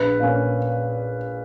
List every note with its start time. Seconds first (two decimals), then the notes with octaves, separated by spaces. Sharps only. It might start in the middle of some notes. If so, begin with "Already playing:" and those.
Already playing: A#1 B4
0.19 A#2 A#3 C#4